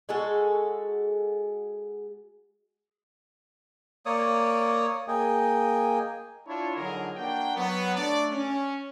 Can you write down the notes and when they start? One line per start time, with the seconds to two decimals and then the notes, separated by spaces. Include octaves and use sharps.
0.09 G#3 F#4 G#4 A4
4.06 A#3 C#5 D5 D#6
5.08 A#3 G#4 D#5 G5 G#5
6.47 D4 E4 F4 C#5
6.76 D3 F3 F#3 D#4 G#4 A#4
7.17 A#3 D4 F#4 A#4 G5
7.56 F#3 B3
7.96 A3 D4 D5
8.32 C#4